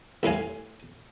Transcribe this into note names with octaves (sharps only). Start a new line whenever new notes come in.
C2 A2 F5 G#5